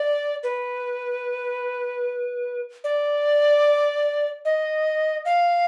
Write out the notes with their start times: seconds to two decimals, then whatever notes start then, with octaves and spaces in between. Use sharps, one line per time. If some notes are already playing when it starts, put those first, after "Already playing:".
Already playing: D5
0.43 B4
2.84 D5
4.45 D#5
5.25 F5